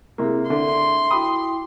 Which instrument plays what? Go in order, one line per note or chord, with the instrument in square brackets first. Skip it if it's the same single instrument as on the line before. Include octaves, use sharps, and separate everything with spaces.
[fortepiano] C3 A#3 [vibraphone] E4 G#4
[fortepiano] D3 [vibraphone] E5 [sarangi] C6
[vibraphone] E4 F#4 G5 [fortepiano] B5 D6 D#6